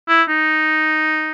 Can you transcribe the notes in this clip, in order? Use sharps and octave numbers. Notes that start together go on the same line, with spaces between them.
E4
D#4